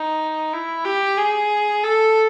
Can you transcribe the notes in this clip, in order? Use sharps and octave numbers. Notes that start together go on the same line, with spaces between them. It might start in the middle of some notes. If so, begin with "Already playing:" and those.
Already playing: D#4
E4
G4
G#4
A4